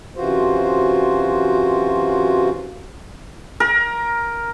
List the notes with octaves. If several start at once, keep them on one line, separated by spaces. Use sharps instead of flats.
F#2 C3 E3 F4 F#4 C5
A#4